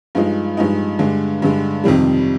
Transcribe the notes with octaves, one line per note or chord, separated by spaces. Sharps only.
G2 F3 G#3 D#4
G2 F3 G#3 D#4
G2 D3 G#3
G2 D3 G#3
F2 C3 D#3 G3